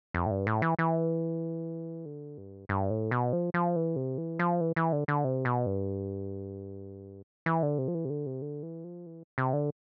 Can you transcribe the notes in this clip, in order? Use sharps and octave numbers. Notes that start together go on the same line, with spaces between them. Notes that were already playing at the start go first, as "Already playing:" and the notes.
F2
A2
G2
A2
E3
E3
D3
G2
G2
A2
B2
F3
F3
E3
C3
E3
F3
E3
E3
D3
D3
C3
B2
G2
E3
D3
C3
F3
E3
C3
D3
C3
D3
E3
F3
E3
C3
D3